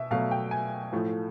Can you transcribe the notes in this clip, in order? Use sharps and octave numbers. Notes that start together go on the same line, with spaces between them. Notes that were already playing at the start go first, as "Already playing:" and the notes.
Already playing: B2 E5
B2 F#3 A3 F5
G5
G#5
A2 F3 A3